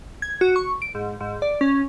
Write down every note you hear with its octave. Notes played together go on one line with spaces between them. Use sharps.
G#6
F#4
C#6
D7
G#2
G#2
D5
C#4